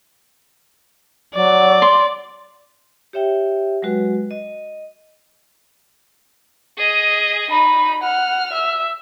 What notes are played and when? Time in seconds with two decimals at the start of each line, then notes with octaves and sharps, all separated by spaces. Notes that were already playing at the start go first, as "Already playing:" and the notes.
1.34 F#3 D5
1.82 C6
3.13 G4 C#5 E5 G5
3.82 F#3 G#3 F#4 B4
4.31 D#5
6.78 G#4 D#5
7.51 D#4 B5
8.03 F#5 F6
8.53 E5